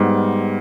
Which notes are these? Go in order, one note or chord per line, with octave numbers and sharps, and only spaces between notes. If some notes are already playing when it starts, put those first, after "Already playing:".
Already playing: G#2 G3 B3